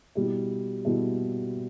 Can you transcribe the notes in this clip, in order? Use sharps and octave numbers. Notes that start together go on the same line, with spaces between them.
B2 G3 E4
B2 G3 E4